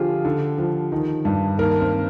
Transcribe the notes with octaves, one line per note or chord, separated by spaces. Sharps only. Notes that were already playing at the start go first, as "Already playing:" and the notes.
Already playing: D3 F3 F4 G4 G#4
D3
F3
D#3
G2
D#3 A#3 A#4
C4 C5